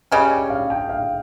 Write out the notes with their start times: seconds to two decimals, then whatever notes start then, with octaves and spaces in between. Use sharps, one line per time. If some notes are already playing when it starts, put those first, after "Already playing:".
0.12 C#3 G3 C#4 D#5
0.31 G5
0.50 F5
0.70 G5
0.89 F5